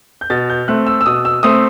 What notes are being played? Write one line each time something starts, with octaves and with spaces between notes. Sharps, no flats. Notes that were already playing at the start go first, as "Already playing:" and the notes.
G6
B2 A6
G6
A3 C4 F#6
E6
E6
B2 D#6
E6
A3 C4 D#6